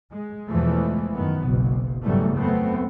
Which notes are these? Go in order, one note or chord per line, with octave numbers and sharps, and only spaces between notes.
G#3
E2 B2 E3 F3 G#3 A3
F#2 D#3 B3
F#1 B1 B2
E2 G#2 C#3 F#3 G3 A3
F#2 A3 B3 C4